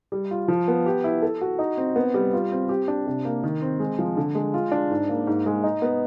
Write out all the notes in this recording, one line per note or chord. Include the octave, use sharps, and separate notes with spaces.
G3
F4
F3
B3
G4
E4
A4
F#4
D#4
C4
B3
G3
F4
C4
G4
D4
C3
A#3
D#3
C4
G#3
F3
D3
G#3
F4
D4
G#2
A#3
G#2
G#3
D#4
B3